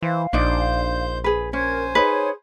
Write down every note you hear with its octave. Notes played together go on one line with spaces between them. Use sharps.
E3 C5 F5
A#1 D4 D#4 C5 D5 G6
G#4 B4
C#4 A#4 C5 G#5 G#6
D#4 G#4 B4 C#5